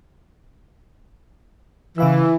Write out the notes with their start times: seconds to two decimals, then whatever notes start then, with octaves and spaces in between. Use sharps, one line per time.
1.98 C#3 E3 F5 E6